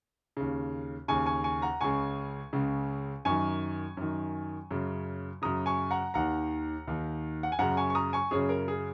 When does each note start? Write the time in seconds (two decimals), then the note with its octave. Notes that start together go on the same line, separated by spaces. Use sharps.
0.37 D#2 C#3
1.08 D#2 C#3 G#5 C#6
1.26 G#5 C#6
1.44 G#5 C#6
1.62 F#5 A#5
1.81 C#2 C#3 G#5 C#6
2.53 C#2 C#3
3.25 F#2 D#3 G#5 C#6
3.97 F#2 D#3
4.71 F#2 C#3
5.42 F#2 C#3 A#5 D#6
5.66 G#5 C#6
5.91 F#5 A#5
6.14 D#2 D#3 F#5 A#5
6.87 D#2 D#3
7.43 F#5
7.52 G#5
7.59 F#2 C#3 F#5 A#5
7.77 G#5 C#6
7.90 C#6
7.95 A#5 D#6
8.13 G#5 C#6
8.31 F#2 C#3 G#4 C#5
8.49 A#4
8.68 G#4